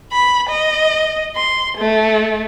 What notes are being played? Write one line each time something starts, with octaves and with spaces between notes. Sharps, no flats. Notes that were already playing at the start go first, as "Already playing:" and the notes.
B5
D#5
C6
A3